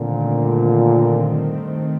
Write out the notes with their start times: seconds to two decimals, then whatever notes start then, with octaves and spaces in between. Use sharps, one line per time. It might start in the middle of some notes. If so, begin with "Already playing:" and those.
Already playing: G2 A#2 D3 D#3 A3 C4